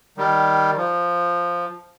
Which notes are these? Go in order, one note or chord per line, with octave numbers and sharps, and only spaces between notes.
D#3 G3
F3